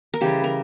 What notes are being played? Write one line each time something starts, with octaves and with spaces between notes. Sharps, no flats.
A#4
C#3 E3 G3 G4
A#4